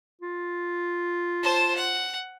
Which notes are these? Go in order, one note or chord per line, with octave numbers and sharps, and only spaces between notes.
F4
C5 A5
F#5